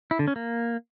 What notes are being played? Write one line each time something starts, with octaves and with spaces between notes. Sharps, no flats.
E4
D3
C#4
A#3